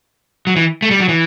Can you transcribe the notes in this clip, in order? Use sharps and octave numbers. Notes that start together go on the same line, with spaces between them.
F#3
E3
A3
G3
F#3
E3